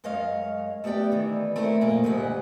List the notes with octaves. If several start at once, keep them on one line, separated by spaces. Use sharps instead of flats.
F#2 G#3 C#5 D#5 F5
A3 B3 G4 D5 G5
D#3 E3
A3 C4 E4 A#4
F2 A#2 A#3
D2 G2 A#2 G#3 G4 F#5